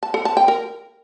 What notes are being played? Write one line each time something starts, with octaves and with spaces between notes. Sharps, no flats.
A5
A4
A5
G5
A#4